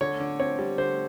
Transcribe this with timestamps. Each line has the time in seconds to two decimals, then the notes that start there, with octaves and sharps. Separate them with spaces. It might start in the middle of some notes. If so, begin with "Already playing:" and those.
0.01 D3 C#5
0.20 D3
0.40 C4 C#5
0.59 G3
0.78 D3 C5